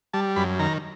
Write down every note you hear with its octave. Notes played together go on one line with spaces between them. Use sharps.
G3 A5
F#2 B5
D#3 A#5